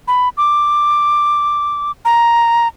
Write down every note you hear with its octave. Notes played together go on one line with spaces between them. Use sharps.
B5
D6
A#5